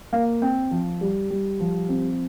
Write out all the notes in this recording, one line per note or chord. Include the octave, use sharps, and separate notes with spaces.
A#3 F5
C4 G5
F3
G3
G3
F3
C4